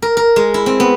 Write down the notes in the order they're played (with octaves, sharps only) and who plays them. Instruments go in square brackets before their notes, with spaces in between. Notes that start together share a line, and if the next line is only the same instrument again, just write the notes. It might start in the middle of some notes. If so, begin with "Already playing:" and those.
[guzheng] A#4
A#4
G#3
E4
C4
B3